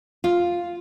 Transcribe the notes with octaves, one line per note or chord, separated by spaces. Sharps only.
F4